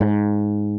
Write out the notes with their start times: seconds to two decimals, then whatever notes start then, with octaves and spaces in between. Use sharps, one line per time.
0.01 G#2